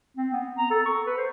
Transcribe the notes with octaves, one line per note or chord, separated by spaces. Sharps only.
C4
B3
A#5
A4
C#6
B4
C5